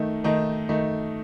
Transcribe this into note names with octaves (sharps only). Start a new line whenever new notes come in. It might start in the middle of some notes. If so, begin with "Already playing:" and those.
Already playing: D#3 A3 D#4
D#3 A3 D#4
D#3 A3 D#4